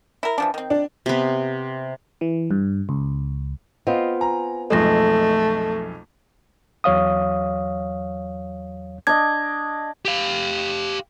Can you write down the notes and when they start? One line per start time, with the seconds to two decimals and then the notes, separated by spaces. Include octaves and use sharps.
0.23 E4 A#4
0.38 E3 F3 D4
0.54 D#3 C4
0.70 D4
1.06 C3 B3
2.21 E3
2.51 G2
2.89 C#2
3.87 B3 C4 F4 D#5
4.21 G#5 A#5
4.70 B1 F2 G#3 A3 A4 A#6
6.84 E2 F#3 C#5 F5 D#6
9.07 D4 D#5 G#6
10.05 G4 F5